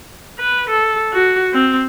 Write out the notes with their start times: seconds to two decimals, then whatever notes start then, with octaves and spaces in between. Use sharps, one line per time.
0.39 B4
0.69 A4
1.13 F#4
1.53 C4